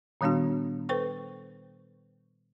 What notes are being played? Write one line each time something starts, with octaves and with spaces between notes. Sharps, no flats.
A#2 D#3 G3 B3 D4 F#4
A4 B4 C5 G5 C#6